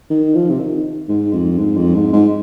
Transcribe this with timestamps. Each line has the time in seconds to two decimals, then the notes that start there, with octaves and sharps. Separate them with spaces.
0.10 D#3
0.35 F3
0.50 C3
0.59 D#3
1.09 G#2
1.33 F2
1.58 G#2
1.77 F2
1.94 G#2
2.13 G#2